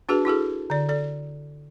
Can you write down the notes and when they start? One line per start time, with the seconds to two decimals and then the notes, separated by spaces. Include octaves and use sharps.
0.09 D4 F#4 G#4 B4 A5
0.25 E4 F#4 G#4 A4
0.70 D3 D5
0.89 A4 D5